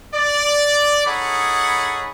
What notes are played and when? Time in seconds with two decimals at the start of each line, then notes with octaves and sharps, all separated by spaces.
0.14 D5
1.05 D#4 G#4 A4 C#5 F#5 B5